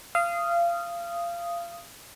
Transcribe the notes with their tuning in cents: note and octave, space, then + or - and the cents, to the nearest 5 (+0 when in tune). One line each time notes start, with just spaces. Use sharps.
F5 -25 D#6 +0